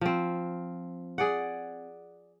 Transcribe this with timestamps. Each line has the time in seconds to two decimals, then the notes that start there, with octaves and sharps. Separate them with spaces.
0.01 F3 C4
1.18 G#4 D5 F#5